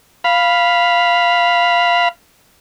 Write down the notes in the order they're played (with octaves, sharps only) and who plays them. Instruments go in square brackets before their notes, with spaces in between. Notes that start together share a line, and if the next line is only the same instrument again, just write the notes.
[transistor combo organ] F5 B5